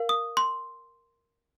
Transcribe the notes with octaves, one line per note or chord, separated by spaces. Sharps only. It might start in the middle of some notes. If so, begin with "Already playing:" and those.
Already playing: A#4 F5
D#6
C6